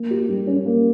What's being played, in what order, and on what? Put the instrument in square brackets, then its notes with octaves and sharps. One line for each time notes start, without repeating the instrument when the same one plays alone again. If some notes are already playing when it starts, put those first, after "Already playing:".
Already playing: [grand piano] A#3
G4
G3
C#4
A#3